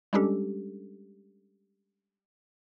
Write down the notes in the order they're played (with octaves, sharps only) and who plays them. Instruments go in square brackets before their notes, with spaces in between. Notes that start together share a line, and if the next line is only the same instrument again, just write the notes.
[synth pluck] G3 G#3 C#4 D4 G4 A4